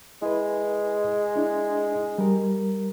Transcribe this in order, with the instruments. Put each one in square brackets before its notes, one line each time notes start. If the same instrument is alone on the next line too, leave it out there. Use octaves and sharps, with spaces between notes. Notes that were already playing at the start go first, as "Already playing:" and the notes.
[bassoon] G#3 [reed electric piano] E4 B4
[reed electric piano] D4 E4
G3 A#4